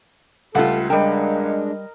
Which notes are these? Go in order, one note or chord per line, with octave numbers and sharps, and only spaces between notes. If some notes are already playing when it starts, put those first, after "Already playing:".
C#2 G3 A3 F4 A4 F#5
G3 G#3 D4 A#4 D#5 G5